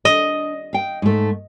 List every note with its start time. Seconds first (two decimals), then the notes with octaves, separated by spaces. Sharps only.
0.05 D4 D#5
0.73 F5 G5
1.02 G#2 A3